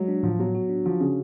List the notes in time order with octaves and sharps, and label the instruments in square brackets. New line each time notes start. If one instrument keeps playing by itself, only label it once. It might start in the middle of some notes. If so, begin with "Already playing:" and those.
Already playing: [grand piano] F#3 [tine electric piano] G#3
[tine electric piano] D4
[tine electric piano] A2 [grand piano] F3
[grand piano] F#3 [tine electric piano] B3
[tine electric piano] F#4
D4
[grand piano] F3 [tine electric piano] F#4
[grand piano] C#3 [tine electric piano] C#4